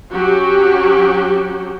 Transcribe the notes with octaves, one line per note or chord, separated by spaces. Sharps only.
F#3 C#4 F#4 G4